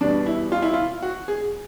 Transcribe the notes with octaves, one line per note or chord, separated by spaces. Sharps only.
E2 B2 G3 D4
E4
F4
E4
F4
F#4
G#4